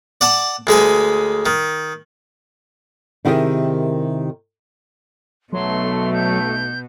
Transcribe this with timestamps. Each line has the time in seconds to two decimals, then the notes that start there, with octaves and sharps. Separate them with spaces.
0.21 D5 F#5 A5
0.67 D2 G#3 B4 G#5
1.46 D#3
3.25 C3 D#3 E4 G4 G#4 A#4
5.53 B1 B2 F#3 A3 C6
6.14 G6